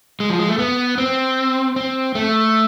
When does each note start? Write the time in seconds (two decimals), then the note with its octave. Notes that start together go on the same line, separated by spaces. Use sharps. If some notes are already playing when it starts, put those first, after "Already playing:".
0.20 G#3
0.29 F3
0.39 G#3
0.49 A3
0.59 B3
0.98 C4
1.76 C4
2.15 A3